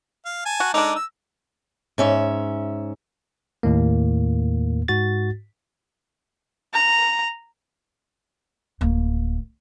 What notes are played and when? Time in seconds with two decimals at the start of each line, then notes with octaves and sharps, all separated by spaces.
0.25 F5
0.46 G#5 A5
0.60 F#4
0.74 G#3 D4 D#4 A4 D5
0.96 E6
1.98 G#2 C#4 E5
3.63 D#2 A2 A#3
4.88 G#2 F#4 A6
6.74 A#5
8.81 D1 A#3